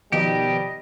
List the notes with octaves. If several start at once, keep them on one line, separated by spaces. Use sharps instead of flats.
B2 D#3 F3 G3 G4 D#5